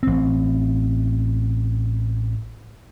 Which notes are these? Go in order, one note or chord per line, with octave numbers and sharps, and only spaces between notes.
A1 C4